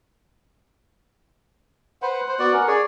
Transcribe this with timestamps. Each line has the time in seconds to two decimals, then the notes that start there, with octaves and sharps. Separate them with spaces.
2.02 B4 C5 F#5
2.28 C5
2.39 B3 F#4 D5
2.53 C#4 A#4
2.68 G#4 C#5 D5